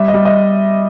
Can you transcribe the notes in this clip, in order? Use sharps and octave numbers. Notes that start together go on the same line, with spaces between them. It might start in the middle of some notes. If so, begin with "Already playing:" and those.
Already playing: G3 E5
D#5
G3
D#5